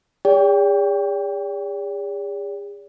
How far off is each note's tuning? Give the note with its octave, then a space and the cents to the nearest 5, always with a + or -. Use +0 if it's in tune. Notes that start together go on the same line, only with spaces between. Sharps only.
G#4 -40 D5 -45 G5 +10